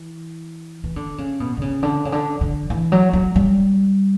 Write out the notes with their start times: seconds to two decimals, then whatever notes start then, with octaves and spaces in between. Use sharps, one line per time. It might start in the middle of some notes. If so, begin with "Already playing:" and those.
Already playing: E3
0.84 E3
0.96 D3
1.18 C#3
1.40 B2
1.57 D3
1.62 C#3
1.83 D3
2.05 C#3
2.12 D3
2.41 D3
2.70 E3
2.92 F#3
3.13 F#3
3.36 G3